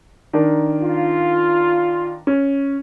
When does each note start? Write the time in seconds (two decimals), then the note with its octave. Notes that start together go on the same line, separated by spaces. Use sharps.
0.33 D#3 D4 A#4
0.82 F4
2.27 C#4